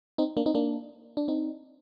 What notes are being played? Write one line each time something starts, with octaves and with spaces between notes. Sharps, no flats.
C4 D#4
A#3 D4
C4 D#4
A#3 D4
D4
C4 D#4